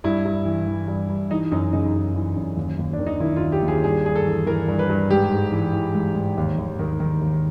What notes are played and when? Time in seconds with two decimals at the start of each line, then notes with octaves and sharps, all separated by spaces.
0.04 G2 E4
0.25 G2
0.45 E3
0.67 E3
0.88 G2
1.09 G2
1.31 E3 D#4
1.51 F#2 D#4
1.73 C#3 D#4
1.94 F#2
2.15 E3
2.36 F#2
2.57 D#2
2.79 D#2
2.93 D4
2.99 D#3
3.06 D#4
3.20 D#3 E4
3.36 F4
3.42 D#2
3.52 G4
3.63 D#2
3.68 G#4
3.83 G2 G#4
4.04 G2 G#4
4.16 A4
4.26 E3
4.46 E3 A#4
4.68 G2
4.79 B4
4.90 G2
5.11 G#2 G4
5.31 G#2
5.52 E3
5.73 E3
5.95 G#2
6.15 G#2
6.37 D#2
6.58 D#2
6.79 D#3
7.00 D#3
7.21 D#2